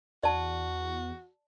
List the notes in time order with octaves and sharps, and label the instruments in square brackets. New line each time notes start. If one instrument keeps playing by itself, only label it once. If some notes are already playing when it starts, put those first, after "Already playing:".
[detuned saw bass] E2 [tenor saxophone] F#4 [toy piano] D5 A5